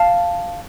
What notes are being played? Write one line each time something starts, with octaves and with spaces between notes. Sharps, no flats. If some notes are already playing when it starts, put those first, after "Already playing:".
Already playing: F5 A5